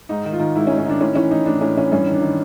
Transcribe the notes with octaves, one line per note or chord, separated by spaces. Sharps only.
G#2 D#4
D#3
F4
D#3
G#2 E4
C#4
G#2
C#4
D#3 D4
A2 C#4
E3 C#4
E3 D#4
A2 D4
A2 C#4
E3 C#4
G2 C#4
D#3
D4
D#3